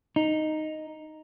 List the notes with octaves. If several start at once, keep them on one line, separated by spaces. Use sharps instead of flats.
D#4